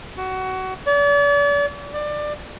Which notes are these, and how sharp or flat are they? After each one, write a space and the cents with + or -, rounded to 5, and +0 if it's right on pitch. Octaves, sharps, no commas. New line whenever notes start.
F#4 +20
D5 -40
D5 +20